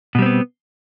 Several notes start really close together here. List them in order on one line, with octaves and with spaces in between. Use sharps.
B2 G3 C4 B3